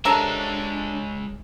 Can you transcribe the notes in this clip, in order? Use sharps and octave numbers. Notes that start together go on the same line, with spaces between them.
C3 G#3 D4 A4 A#4 C#5